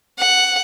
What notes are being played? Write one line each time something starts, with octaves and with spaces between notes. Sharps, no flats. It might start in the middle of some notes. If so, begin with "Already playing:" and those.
F#5